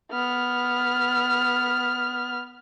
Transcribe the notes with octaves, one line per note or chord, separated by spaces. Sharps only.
B3 F6